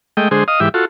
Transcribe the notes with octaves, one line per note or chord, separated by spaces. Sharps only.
G#3 A3 D#5 G5
D3 G#3 G#4 C5
D#5 F5 D#6
G#2 E3 G4 E5
F4 F#4 A4